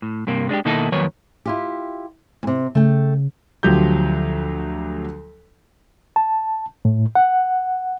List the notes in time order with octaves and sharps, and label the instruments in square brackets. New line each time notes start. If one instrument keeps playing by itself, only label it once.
[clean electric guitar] A2
G2 C3 A#3
G#3 D4 D#4 G4
B2 D#3 A#3 D#4 E4 A4
F2 D#3 F#3 A#3 B4 C#5
[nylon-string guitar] E4 F4 G4
E2 C3
[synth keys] C#3 [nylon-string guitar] A3 G5
[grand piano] D2 F3 F#3 G4 G6
[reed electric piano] A5
A2
F#5